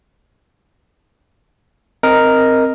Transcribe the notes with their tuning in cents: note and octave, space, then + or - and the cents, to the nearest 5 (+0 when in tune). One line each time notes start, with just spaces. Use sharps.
C4 +0 A#4 +0 D#5 +0